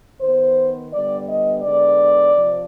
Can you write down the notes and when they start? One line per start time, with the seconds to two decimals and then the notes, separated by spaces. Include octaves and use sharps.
0.21 D#3 B3 C5
0.93 D3 G3 B3 D5
1.28 D#5
1.63 D3 G#3 B3 D5
2.35 C3 F3